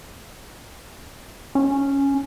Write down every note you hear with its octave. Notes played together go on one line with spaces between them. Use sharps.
C#4